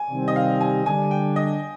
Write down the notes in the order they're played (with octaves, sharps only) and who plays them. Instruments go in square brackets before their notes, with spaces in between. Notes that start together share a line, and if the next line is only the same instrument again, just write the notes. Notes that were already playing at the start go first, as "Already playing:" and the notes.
Already playing: [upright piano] G#5
[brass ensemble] C3 D#3 G3 C4
[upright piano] D#5
F5
G#5
[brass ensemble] D3 G3 D4 [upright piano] G#5
[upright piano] G5
D#5